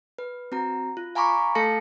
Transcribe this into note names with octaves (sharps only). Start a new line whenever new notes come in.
B4
C4 F#4 A#5
F4
F5 G#5 A#5 B5 C#6 D6
A3 A4 F5 A5 A#6 C#7